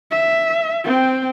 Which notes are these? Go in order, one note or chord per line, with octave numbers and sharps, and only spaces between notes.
E5
C4 G5